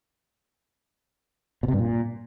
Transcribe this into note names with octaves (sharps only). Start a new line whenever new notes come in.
B2
C3
G2
A#2